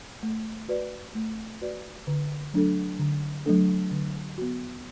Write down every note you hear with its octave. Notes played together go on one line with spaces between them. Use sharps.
A3
F#4 B4 D5
A3
F#4 B4 D5
D3
F#3 A3 D4 A4
D3
F#3 A3 D4 A4
D3
B3 F#4